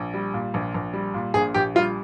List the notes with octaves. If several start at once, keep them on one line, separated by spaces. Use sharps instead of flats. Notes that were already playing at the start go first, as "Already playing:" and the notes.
Already playing: A#1
G3
A#2
A#1
A#1
G3
A#2
A#1 G#4
A#1 G4
G3 F4